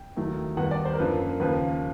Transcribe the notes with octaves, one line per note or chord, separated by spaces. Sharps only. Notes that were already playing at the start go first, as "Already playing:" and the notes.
Already playing: G5
D#2 D#3 F#3 A3
D#2 D#3 G3 B3 F#5
D5
C5
A#4
F#2 D3 F3 A#3 B4
D#2 C#3 F3 A#3 B4